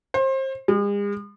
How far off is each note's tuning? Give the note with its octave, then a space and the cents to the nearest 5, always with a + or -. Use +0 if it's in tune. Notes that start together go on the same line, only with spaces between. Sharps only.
C5 +30
G#3 -45